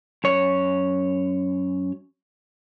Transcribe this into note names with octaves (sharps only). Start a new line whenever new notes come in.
F#2 C#5